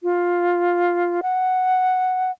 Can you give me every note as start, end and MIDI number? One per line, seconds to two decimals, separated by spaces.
0.03 1.21 65
1.23 2.31 78